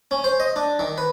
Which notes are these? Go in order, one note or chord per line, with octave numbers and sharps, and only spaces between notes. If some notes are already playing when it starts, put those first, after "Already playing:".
C#4
C5
D#5
D4
D#3
B4